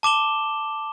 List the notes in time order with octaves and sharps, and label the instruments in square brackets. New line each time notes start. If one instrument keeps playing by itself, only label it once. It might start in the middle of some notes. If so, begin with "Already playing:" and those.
[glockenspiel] A5 D6 E7 G7